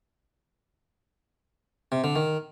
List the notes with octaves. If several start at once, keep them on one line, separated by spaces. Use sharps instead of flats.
C3
D3
D#3